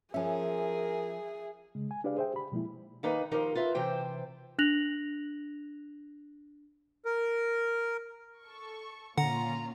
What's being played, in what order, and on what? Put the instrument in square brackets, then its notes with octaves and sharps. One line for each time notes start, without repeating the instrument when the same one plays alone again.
[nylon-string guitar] F3 C#4 [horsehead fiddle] G#4 [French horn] A#4 [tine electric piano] E5 G#5
[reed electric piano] C#3 G#3
G#5
D4 G4 G#4 B4 D5 F5
G#4 C5 E5 G5
G4 B5
B2 F3 G#3 A#3 E4
[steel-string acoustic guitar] D#3 A#3 D#4 B4 D#5
D#3 F3 D#4 G4 A#4 C5
F4 B4 E5
C3 E3 C5 G5
[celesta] D4 F#6 A#6 F7 F#7
[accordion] A#4
[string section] A4 C#6
[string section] A#2 C#4 F4 [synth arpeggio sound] D3 [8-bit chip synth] F#5 [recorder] A#5